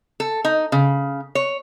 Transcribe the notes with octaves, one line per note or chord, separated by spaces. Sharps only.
A4
D#4
C#3
C#5